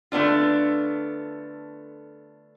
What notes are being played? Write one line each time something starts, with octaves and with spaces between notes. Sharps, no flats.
D3 A3 B3 D4 F4